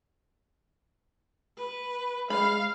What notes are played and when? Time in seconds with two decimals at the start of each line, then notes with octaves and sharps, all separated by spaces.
1.58 B4
2.30 G#3 F5 B5